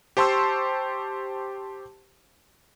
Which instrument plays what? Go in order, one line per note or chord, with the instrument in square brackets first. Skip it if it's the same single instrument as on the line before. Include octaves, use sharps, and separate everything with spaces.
[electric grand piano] G4 C5 A5 C6 C#6 E6